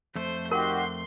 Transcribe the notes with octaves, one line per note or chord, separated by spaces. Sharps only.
F2 A3 C5
D#3 F#4 G4 A#4 C6